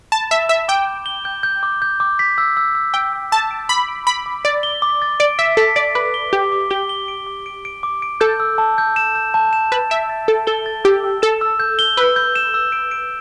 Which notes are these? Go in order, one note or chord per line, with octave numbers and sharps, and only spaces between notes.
A5 B5
E5 E7
E5 E7
G5 D6
G6
G7
G6
G6
D6
G6
D6
B6
E6
E6
E6
G5 E6
E6
A5 E6
D7
B5 D6
D7
B5 D7
D6
D5 A6
G7
D6
A6
D5 D7
E5 B6
A4 B6
D5 D7
B4 D6
G7
G4 D6
D6
G4 G7
G7
D7
D6
D7
D7
D6
D7
A4 G6
E6
A5
G6
E7
G6
A5
E7
B4 A6
E5 D7
A6
A4 D7
A4 G7
A6
G4 E6
E6
A4 E7
E6
G6
G7
B4 E6
G6
E7
E6
D7
D7